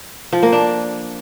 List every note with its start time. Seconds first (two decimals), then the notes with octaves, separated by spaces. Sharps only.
0.33 F3
0.43 A#3
0.53 D4